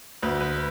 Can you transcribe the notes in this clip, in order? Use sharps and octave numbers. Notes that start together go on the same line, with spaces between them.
D2 B4
B4